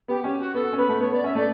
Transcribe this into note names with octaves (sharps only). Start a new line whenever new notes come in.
B3 G4
C#4 G4
F#4
B3 A4
C#4
B3 B4
A3
B3 C#5
B3 D5
C#4 E5
A3 D5